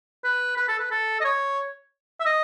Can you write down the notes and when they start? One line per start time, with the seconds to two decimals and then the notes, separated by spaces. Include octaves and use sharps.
0.24 B4
0.57 B4
0.68 A4
0.79 B4
0.91 A4
1.21 D#5
1.24 C#5
2.20 E5
2.26 D#5